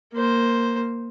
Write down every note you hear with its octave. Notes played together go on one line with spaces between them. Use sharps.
A#3 C5